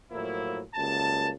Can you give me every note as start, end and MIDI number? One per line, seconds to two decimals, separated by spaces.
0.11 0.60 45
0.11 0.60 53
0.11 0.60 54
0.11 0.60 58
0.11 0.60 64
0.75 1.30 37
0.75 1.30 42
0.75 1.30 55
0.75 1.30 58
0.75 1.30 81